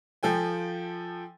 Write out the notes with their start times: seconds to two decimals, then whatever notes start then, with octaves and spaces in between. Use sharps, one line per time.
0.23 F3 A4 G5 G#5